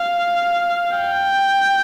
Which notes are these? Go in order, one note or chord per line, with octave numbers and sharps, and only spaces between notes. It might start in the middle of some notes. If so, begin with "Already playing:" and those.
Already playing: F5
G5